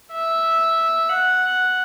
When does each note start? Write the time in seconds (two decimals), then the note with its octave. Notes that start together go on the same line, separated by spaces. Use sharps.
0.13 E5
1.10 F#5